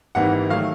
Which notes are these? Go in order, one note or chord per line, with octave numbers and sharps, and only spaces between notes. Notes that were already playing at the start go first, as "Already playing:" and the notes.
G#1 G#2 E3 G3 A#3 F#5
D#3 F#3 A3 F5